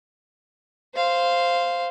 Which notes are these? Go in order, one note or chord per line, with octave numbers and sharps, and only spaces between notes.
C5 F5